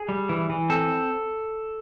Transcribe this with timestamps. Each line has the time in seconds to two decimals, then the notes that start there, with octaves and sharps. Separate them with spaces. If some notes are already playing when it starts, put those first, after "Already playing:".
Already playing: G#4
0.09 G3
0.29 E3
0.50 E3
0.70 C4 A4